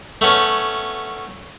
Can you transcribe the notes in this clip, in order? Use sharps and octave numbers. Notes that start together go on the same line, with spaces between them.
A3 B3 C#4